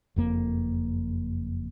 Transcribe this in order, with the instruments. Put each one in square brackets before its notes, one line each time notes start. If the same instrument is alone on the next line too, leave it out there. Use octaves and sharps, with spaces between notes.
[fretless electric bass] F#1 F2 A#3